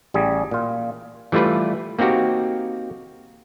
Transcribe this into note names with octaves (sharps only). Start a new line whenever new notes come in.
A1 G3 G#4
A#2 F4
E3 G3 A3 F4 B4
A#3 C4 D#4 F#4 G4